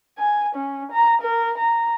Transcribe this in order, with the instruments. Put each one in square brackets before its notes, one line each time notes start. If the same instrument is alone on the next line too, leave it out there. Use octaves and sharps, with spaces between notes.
[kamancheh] G#5
C#4
A#5
A#4
A#5